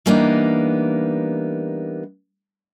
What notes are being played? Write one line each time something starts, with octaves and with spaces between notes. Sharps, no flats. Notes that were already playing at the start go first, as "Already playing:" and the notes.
E3 G3 A#3 B3 D4 D#4